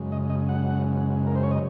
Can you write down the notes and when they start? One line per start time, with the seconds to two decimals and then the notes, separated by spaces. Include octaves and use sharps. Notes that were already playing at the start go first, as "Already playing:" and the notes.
Already playing: F#2 C#3 G#3
0.12 D#5
0.30 D#5
0.49 F#5
1.27 A#4
1.35 C5
1.43 C#5
1.51 D#5